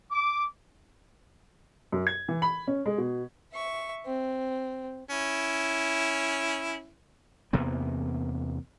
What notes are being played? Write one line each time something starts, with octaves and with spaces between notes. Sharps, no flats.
D6
F#2
G#6
E3
B5
C#4
G#3
B2
E5 C#6
C4
C#4 E4
E2 C3 A#3 B3